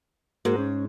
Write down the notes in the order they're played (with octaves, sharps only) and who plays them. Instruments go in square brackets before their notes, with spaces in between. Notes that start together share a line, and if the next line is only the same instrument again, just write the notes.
[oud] G#2 [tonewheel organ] A#3 F#4 A#4
[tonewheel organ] C#4